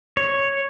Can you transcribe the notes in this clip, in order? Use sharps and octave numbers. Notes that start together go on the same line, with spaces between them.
C#5